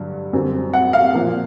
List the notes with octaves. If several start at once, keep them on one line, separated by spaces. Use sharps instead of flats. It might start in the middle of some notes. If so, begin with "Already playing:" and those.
Already playing: G2 D3 F#3
F#2 D3 G3 C4
F#5
F5
A#2 F3 A#3